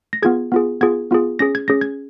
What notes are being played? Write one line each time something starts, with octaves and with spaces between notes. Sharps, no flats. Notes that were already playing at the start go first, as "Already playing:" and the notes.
A#6
B3 F4 G#4 G#6
B3 F4 G#4
B3 F4 G#4 G#6
B3 F4 G#4
C#4 G#4 A#6
G#6
C#4 G#4 A#6
G#6